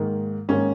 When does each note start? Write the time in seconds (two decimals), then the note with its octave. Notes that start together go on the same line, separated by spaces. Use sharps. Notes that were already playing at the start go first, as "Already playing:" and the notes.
Already playing: G#2 D#3 A#3
0.49 G#2 D#3 A#3 C#4